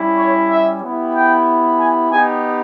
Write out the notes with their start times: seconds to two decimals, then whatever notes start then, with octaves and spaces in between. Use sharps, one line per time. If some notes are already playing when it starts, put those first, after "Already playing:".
Already playing: G3 C#4 E4
0.18 C#5
0.50 E5
0.82 B3 E4 G4
1.13 G5
1.78 G#5
2.10 B3 D#4 G4 G#5